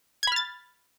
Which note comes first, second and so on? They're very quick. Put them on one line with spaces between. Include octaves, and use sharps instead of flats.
G#6 B5 F6 A6